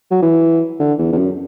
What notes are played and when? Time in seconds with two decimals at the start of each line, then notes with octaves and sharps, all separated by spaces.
0.11 F#3
0.22 E3
0.80 D3
0.98 E2
1.12 E2
1.17 F#2